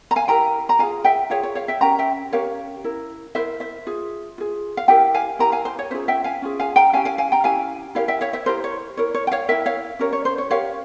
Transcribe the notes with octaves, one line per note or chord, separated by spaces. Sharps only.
A#5
F5 G#5
E4 G4 A#4 G5 A#5
A#5
F4 G#4 F5 G#5
E5 G5
F4 G#4 C#5 F5
C#5
C#5 F5
E5 G5
C#4 G4 A#4 G5 A#5
E5 G5
C#4 G4 A#4 C#5 F5
E4 A#4
E4 A#4 C5 E5
C5 E5
F4 G#4
F4 G#4
F5
E4 G4 A#4 E5 G5
F5 G#5
E4 G4 A#4 G5 A#5
F5 G#5
C5
C#5
C#4 F4 G#4 C5 E5
E5 G5
F5 G#5
C#4 F4 G#4
F5 G#5
G5 A#5
C#4 E4 G4 F5 G#5
F5 G#5
F5 G#5
G5 A#5
C#4 E4 G4 F5 G#5
E4 G4 A#4 C#5 F5
E5 G5
C#5 F5
C5 E5
E4 G4 A#4 C5
C#5
E4 A#4 C#5
C#5
G5
C#5 F5
E4 A#4 E5 G5
C#5 F5
C#4 G4 A#4 C#5
C#5
C5
C#5
C#4 G4 A#4 C#5 F5